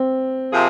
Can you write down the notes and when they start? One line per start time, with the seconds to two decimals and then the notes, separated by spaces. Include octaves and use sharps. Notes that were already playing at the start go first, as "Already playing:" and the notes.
Already playing: C4
0.52 C3 F3 A#3 F4 G#4